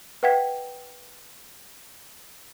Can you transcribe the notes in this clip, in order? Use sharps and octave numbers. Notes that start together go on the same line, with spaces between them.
B4 E5 F#5 G5 G#6 B6